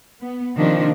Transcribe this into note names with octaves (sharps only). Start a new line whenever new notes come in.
B3
C3 D#3 F3 A#3 D4